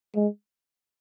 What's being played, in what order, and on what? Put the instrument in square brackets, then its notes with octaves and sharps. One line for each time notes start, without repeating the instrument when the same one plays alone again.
[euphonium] G#3